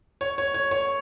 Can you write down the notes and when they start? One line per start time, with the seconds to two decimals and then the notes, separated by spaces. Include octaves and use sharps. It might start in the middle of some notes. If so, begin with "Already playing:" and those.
0.21 C#5
0.38 C#5
0.54 C#5
0.71 C#5